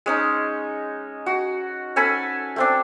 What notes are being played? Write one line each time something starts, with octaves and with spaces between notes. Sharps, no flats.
G#3 C#4 D#4
F#4
C#4 A4 G#5 B5
A3 C4 D4